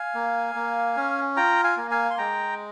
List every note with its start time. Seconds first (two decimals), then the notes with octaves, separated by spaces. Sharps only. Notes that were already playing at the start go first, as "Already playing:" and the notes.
Already playing: F5 G#5
0.14 A#3
0.55 A#3
0.96 C#4
1.37 F4 G5 A#5
1.64 F5 G#5
1.77 A#3
1.91 F5 G#5
2.10 C6
2.18 G#3 G5 A#5